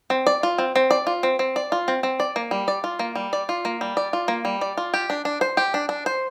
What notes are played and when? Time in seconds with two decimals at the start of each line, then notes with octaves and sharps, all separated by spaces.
0.10 C4
0.27 D5
0.43 F4
0.58 C4
0.75 C4
0.91 D5
1.07 F4
1.23 C4
1.39 C4
1.56 D5
1.72 F4
1.88 C4
2.03 C4
2.20 D5
2.36 A#3
2.51 G3
2.68 D5
2.84 F4
2.99 A#3
3.15 G3
3.33 D5
3.49 F4
3.65 A#3
3.81 G3
3.97 D5
4.13 F4
4.28 A#3
4.45 G3
4.61 D5
4.78 F4
4.94 G4
5.10 D4
5.25 D4
5.41 C5
5.57 G4
5.74 D4
5.89 D4
6.06 C5